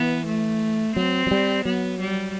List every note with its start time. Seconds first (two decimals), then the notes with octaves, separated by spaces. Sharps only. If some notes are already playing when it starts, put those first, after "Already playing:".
Already playing: E3 B3
0.27 A3
0.96 F#3 C4
1.27 F#3
1.31 G3
1.65 F#3 B3
2.00 G3